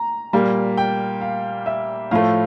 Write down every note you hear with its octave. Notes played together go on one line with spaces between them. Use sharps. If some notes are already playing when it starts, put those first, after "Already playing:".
Already playing: A#5
A#2 G3 A#3
G5
F5
E5
A2 F3 A3 F5